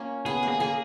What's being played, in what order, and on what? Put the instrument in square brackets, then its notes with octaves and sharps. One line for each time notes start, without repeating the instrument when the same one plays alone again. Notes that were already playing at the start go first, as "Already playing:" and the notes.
Already playing: [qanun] A#3 C#4 F4
[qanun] B3 [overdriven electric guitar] G#4
[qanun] A#3
[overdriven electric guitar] G#4
[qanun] A#3 [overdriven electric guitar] G#4